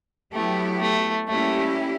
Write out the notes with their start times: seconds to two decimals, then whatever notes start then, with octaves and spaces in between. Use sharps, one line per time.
0.33 F#3 A3 B3 E4 G4
0.81 A3
1.27 G3 A3 A#3 C#4 E4 G4